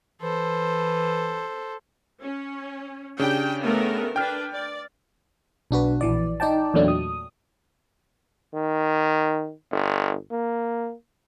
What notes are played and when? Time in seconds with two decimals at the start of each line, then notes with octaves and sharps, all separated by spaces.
0.22 E3 A4 C5
2.20 C#4
3.19 C#3 D4 G4 G5
3.62 A3 B3 A#4
4.16 D4 B4 G5 F6
4.52 D5
5.71 B1 D4 F#4 B4
6.01 A#1 E3 D5
6.40 D#4 D5 G5 A5
6.74 E2 A#2 F#3 A3 D4
6.88 D#6
8.54 D#3
9.72 G1
10.31 A#3